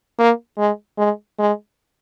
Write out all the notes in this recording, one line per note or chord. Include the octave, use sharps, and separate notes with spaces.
A#3
G#3
G#3
G#3